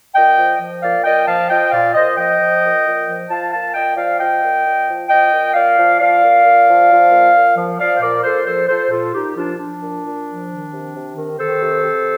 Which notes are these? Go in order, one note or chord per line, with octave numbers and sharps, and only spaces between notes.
A#2 D#5 G5
F3
F3
A#2 D5 F5
A#2 D#5 G5
F3 F5 A5
F3 D#5 G5
A#2 D5 F5
A#2 C5 D#5
F3 D#5 G5
F3
A#2
A#2
F3
F3 F5 A5
A#2 F5 A5
A#2 D#5 G5
F3 D5 F5
F3 D#5 G5
A#2
A#2
F3
F3 D#5 G5
A#2
A#2 D5 F5
F3
F3 D5 F5
A#2
A#2
F3
F3
A#2
A#2
F3
F3 D5 F5
C5
A#2 A#4 D5
A#2 A4 C5
F3 A4 C5
F3 A4 C5
A#2 F4 A4
A#2 D#4 G4
F3 D4 F4
F3 D4
A#2
A#2
F3
D#3
C3
C3
D#3
D#3 A4 C5
C3
C3